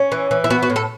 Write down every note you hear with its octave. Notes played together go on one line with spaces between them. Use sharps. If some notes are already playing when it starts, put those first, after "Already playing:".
Already playing: C#4
E3
E3
E4
B3 F#4
F#4
A2
A4